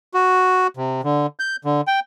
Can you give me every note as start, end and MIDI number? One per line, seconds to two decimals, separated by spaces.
0.14 0.67 66
0.77 1.01 48
1.04 1.27 50
1.39 1.56 91
1.65 1.81 50
1.87 2.00 79